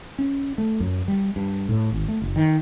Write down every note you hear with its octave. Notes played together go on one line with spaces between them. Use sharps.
C#4
A3
F#2
G3
G2
A2
G#1
A3
F#1
D#3